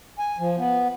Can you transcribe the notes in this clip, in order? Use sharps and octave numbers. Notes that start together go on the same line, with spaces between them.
G#5
F3
B3